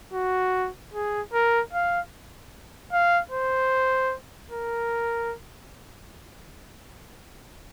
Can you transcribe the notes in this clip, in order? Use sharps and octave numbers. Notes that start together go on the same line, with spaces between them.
F#4
G#4
A#4
F5
F5
C5
A#4